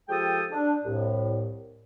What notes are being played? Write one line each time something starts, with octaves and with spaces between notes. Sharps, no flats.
F3 G#3 G4 A4 G5 D#6
D4
C2 A2